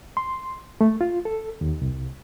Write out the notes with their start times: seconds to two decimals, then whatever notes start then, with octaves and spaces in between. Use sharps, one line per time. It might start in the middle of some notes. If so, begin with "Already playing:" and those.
0.17 C6
0.81 A3
1.01 F4
1.25 A4
1.61 D#2
1.81 C2